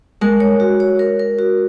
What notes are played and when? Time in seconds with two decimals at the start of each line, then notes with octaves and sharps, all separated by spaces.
0.21 G#3 A#4
0.40 C#5
0.60 F#4
0.80 C#5
0.99 A#4
1.19 A#4
1.39 F#4